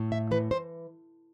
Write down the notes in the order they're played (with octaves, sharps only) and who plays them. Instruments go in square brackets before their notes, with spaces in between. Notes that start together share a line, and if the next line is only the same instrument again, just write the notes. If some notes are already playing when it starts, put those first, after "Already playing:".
Already playing: [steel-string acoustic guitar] A2
E5
E3 B4
C5